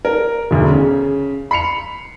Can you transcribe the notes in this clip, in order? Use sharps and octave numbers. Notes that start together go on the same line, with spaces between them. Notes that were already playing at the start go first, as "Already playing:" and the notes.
A#4
E1 D2
C#3
B5 C7 C#7 F7